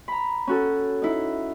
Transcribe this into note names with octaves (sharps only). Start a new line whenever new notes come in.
A#5 B5
C#4 F#4 A4
D#4 E4